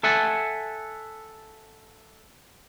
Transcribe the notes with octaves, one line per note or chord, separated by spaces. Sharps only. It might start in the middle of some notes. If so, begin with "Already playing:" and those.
A4 E5 F#5 G#5 A5